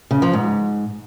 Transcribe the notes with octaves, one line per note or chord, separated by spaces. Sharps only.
C#3
F3
G#2